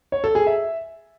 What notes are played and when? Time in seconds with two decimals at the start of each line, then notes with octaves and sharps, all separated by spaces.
0.12 C#5
0.24 A4
0.35 G#4
0.47 E5